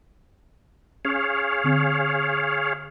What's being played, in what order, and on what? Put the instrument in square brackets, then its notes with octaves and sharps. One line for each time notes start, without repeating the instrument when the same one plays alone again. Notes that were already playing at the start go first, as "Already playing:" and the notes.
[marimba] C#4 [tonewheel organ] G#4 C#5 F5
[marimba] D3 C4